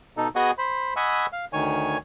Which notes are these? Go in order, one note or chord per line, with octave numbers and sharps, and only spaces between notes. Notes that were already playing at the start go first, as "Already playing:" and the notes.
B2 D#4 A4
B3 F#4 G#4 D#5 F#5 G#5
C5 B5
D#5 F#5 G#5 B5 C#6 E6
F5
D2 D#3 C#5 G#5